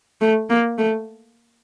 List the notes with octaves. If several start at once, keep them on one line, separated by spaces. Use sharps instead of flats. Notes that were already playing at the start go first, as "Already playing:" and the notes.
A3
A#3
A3